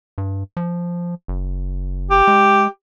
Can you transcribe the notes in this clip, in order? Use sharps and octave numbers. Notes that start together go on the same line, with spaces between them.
G2
F3
F#1
G4
G#3